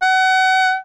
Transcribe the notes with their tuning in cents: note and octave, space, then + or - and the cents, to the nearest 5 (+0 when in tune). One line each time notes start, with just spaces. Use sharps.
F#5 +30